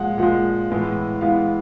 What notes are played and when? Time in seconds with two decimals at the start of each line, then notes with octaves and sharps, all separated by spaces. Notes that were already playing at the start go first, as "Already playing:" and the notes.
Already playing: A#2 F3 G#3 F#5
0.18 A#2 F3 G#3 F#5
0.70 A2 E3 G#3 B3
1.21 A2 E3 G#3 B3 F5